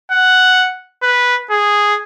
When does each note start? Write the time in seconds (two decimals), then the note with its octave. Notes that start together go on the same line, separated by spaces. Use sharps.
0.12 F#5
1.03 B4
1.51 G#4